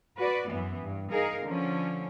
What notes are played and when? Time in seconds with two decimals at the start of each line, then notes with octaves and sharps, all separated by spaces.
0.18 F#4 B4 D5
0.50 F#2 E3 B3
0.82 G2
1.11 D#4 G#4 A#4 F5
1.45 D3 F3 C#4